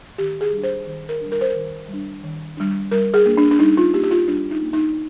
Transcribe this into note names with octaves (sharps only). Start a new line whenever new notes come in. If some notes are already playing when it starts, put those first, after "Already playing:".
D#3 G4
G#4
G3 D4
C5
D#3 C5
A#4
G3 D4
A#4
C5
A#4
D#3
G3 D4
D#3
G3 D4
G3 A#4
G#4
A#3 D4
D4
D4
G3 D#4
F4
A#3 D4 G4
G4
F4
G3 D4
D#4
A#3 D4
D#4